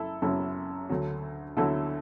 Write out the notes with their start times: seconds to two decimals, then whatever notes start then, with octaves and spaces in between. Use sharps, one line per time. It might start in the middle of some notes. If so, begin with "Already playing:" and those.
Already playing: F#1 E4 A4
0.22 F#1 F#2 F#3 E4 A4
0.89 D2 D3 F#3
1.57 D2 D3 F#3 E4 A4